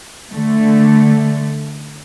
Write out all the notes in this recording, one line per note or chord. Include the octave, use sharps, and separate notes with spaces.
D3 A3